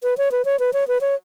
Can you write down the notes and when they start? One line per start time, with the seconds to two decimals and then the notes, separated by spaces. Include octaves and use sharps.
0.03 B4
0.18 C#5
0.32 B4
0.45 C#5
0.60 B4
0.73 C#5
0.88 B4
1.01 C#5